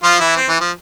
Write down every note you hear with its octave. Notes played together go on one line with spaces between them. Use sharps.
F3 F4
E3 E4
C4
E3
F3